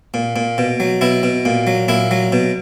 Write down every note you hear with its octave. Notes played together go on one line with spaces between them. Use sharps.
A#2
A#2
B2
F#3
B2 E4
B2
A#2
F#3
A#2 E4
F#3
B2